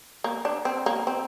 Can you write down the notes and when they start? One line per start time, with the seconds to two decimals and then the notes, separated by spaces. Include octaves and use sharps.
0.24 A#3
0.45 D4
0.65 C4
0.86 A#3
1.07 C4